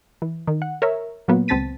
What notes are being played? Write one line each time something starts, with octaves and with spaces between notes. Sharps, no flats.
E3
D#3
F#5
A#4 C#5 E5
A#2 F#3 A#3 B3
C#2 C4 A5 A6 B6 D#7